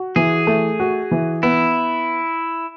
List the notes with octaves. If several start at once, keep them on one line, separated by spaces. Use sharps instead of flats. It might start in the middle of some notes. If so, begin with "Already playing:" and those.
Already playing: F#4
E3 G#4
A3
F#4
E3
B3 E4